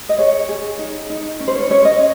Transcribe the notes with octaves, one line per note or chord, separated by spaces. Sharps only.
D#5
G#4 C#5
G#4
D#4
D#4
C#4
C5
C#5
C#4 C#5
D#5